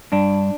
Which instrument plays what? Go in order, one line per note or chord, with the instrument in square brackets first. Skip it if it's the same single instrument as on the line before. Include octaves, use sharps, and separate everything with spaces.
[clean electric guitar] G2 D4